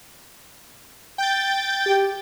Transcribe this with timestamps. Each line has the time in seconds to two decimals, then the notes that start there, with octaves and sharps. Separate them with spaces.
1.18 G5 G6 A6
1.86 G4